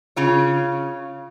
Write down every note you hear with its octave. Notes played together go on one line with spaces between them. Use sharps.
C#3 F4 C#5